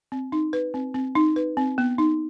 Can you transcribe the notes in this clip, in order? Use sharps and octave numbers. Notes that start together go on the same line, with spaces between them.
C4
D#4
B4
C4
C4
D#4
B4
C4
B3
D#4